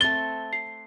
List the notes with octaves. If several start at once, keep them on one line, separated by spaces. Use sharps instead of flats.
A3 C4 A6 G7
C7